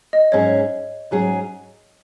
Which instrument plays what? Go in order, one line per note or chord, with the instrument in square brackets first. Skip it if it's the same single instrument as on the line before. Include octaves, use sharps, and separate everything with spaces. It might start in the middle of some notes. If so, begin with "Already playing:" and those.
[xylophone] D#5
[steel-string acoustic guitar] G#2 F#3 C#4 G#4 [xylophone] C#5
[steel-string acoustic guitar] G#2 F#3 C#4 G#4